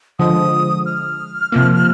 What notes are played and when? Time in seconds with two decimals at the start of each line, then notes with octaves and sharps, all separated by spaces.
0.19 D3 F3 G#3 D#6
0.86 F6
1.52 C3 F3 A#3